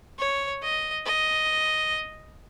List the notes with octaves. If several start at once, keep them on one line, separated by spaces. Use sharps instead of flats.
C#5
D#5
D#5